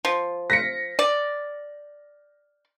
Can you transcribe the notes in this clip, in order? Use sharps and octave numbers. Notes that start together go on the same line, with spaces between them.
F3
A#6 B6 C#7
D5